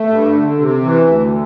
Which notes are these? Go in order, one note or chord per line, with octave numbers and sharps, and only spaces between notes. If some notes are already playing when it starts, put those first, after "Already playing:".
Already playing: A3
G2
D3
C3
E3
D2